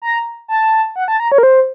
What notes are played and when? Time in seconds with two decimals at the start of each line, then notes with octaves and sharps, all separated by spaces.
0.02 A#5
0.48 A5
0.96 F#5
1.08 A5
1.20 A#5
1.32 C#5
1.38 A#4
1.43 C5